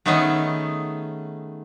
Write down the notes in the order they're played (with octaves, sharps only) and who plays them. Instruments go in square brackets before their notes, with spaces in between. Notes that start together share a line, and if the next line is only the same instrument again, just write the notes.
[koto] D#3 A3 B3 C#4 D#4 G#4